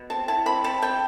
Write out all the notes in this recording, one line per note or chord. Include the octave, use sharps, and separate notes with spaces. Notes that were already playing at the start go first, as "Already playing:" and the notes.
Already playing: B2
C4 A5
E4 A5
C4 B5
C4 A5
C4 G5